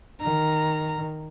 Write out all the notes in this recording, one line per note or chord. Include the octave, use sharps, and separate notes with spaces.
D#3 A#5